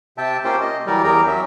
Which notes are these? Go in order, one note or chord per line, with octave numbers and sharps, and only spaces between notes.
C3 E5 G5 A5
A#3 C#4 F4 G4 C5 G5
D#5
E3 F#3 G3 G4 A#4 D5
E2 G4 G#4 A#4 G5 A#5
F#3 C#4 E5